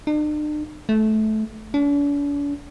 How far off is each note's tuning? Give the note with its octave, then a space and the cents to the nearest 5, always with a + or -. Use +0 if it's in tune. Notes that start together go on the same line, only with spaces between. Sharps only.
D4 +45
A3 -20
D4 -45